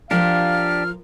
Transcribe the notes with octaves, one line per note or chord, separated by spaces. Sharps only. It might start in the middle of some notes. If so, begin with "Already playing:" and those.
F3 D4 G4 A#4 F5 F6